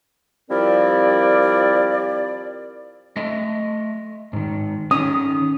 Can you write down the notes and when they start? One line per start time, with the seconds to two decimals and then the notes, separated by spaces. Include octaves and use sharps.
0.50 F3 G3 C4 E4 A#4 D5
3.16 A3 D#5 E5
4.33 G#2 D#3
4.91 D#3 C#4 D#6